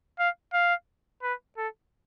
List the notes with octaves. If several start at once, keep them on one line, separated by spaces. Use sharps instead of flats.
F5
F5
B4
A4